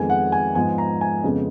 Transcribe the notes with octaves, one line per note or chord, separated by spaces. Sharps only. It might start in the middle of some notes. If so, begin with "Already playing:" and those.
Already playing: F2 D#3 G#3 B3 G#5
F#5
G#5
G#2 F3 B3 G#5
A#5
G#5
F2 C#3 G#3 B3